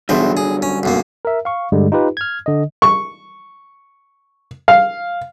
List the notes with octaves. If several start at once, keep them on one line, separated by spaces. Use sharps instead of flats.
B1 E2 G2 D3 F#3 C5
G#4
C#4
B1 F#2 A#3
A#4 E5
F5 C#6
G2 D3 G3 G#3
D#4 F4 G4 B4
F6 G#6
D3 D#5
C#6
F5